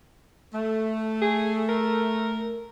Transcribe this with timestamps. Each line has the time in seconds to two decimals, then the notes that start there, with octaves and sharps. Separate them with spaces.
0.53 A3
1.22 G#4
1.69 A#4